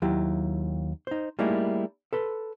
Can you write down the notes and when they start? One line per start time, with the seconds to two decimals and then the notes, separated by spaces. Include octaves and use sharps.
0.02 D#2 F#3 E4 G4
1.07 D#4 C5
1.39 G3 A3 A#3 D#4 E4 G#4
2.13 A4 B4 C6